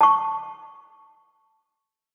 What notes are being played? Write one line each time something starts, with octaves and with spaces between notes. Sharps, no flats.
A5 C#6